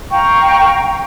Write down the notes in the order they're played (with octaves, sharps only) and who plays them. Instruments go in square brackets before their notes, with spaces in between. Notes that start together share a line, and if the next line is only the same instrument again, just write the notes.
[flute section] F5 G5 A#5 C#6